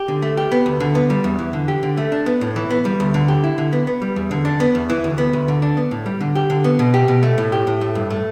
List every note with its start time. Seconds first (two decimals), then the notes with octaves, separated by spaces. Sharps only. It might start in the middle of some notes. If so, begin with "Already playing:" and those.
Already playing: G4
0.08 D3
0.22 A3
0.37 G4
0.52 B3
0.66 D2
0.80 D3
0.95 B3
1.10 G3
1.24 E2
1.39 E3
1.53 D3
1.68 G4
1.83 D3
1.97 A3
2.12 D4
2.26 B3
2.41 A2
2.56 E3
2.70 B3
2.85 G3
3.00 D2
3.14 D3
3.28 G4
3.44 E4
3.58 D3
3.73 B3
3.87 B3
4.02 G3
4.16 E2
4.31 D3
4.45 D4
4.60 B3
4.75 E2
4.90 E3
5.04 D2
5.18 B3
5.33 D2
5.48 D3
5.62 D4
5.77 B3
5.91 A2
6.06 G3
6.20 D3
6.35 G4
6.50 D3
6.64 B3
6.79 B2
6.94 G4
7.08 B2
7.23 A3
7.38 A2
7.52 G4
7.67 A2
7.81 A3
7.95 G2
8.10 A3